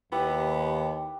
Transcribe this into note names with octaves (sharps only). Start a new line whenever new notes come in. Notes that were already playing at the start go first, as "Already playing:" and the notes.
D#2 B3 E4 G4 B4